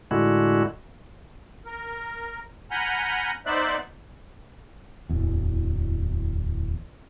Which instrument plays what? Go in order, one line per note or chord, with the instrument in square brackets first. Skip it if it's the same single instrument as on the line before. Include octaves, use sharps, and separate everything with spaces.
[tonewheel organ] A2 D3 G#3 E4 F#4
[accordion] A#4
F#5 G#5 A#5 B5 F6 G6
B3 D#4 C5 D5 E5 F#6
[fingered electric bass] D1 E2